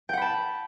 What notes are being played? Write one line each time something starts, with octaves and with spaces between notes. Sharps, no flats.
F#5 G5 A5 B5